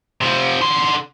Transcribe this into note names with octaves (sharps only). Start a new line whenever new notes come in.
C3 F3
D3 C6